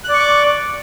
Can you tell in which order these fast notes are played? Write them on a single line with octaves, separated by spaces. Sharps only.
F#6 D5 C#6 D6